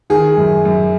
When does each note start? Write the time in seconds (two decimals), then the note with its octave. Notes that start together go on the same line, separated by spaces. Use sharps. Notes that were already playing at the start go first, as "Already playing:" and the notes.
0.10 D#3 G#4
0.37 F#2
0.65 F#2